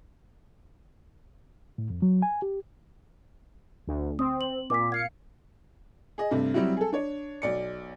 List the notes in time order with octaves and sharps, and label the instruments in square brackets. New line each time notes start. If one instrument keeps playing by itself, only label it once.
[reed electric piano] A2
F2
F#3
G#5
G4
[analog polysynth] D2
[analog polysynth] C4 [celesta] D#6
[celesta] F#7
[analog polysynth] A#2 [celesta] D6 B6
[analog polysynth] F5 C#7 [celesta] G#6 C7
[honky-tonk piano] G#4 D#5
G2 C3 A3
F#3 G3 C4 E4 F#4
G#4 A4
D4 C#5
B1 D5 C#7